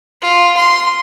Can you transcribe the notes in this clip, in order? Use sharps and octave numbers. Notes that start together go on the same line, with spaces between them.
F4
C6